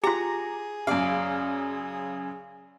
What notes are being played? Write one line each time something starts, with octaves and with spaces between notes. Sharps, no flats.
F4 G4 G#4 A#5
F#2 C#3 D5 F5